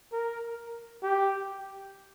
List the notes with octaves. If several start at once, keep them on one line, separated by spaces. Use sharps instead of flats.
A#4
G4